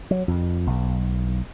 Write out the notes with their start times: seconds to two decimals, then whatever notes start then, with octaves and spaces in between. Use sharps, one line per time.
0.11 F#3
0.28 F2
0.67 B1